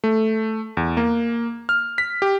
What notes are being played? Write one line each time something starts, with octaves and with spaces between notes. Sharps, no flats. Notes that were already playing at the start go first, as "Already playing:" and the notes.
A3
E2
A#3
F6
B6
G4